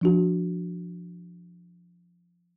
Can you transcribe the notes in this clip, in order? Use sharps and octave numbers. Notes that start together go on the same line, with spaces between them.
F3 D4 F#4